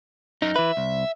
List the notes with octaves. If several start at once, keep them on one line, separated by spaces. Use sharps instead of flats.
F#2 D#4
E3 B4 E5
C2